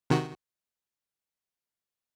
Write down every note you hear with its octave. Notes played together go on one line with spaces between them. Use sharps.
C3 D#3 F#4